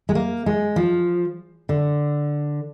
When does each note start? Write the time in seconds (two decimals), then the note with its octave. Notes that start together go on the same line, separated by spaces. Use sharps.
0.09 G#3
0.15 A#3
0.46 G#3
0.76 F3
1.69 D3